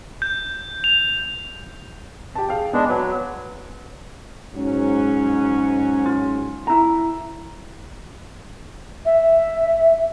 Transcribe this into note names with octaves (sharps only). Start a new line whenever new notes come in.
G6
F7
G4 A5
G#4 F5 G5
G#3 B3 D4
F#3 B4
G#2 F#3 C#4
F4
E4 A#5
E5